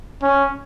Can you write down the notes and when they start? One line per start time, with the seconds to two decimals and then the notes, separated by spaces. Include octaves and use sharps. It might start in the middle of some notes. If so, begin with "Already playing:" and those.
0.23 C#4